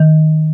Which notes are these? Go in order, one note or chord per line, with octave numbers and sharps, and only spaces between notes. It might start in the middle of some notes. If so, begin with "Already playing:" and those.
Already playing: D#3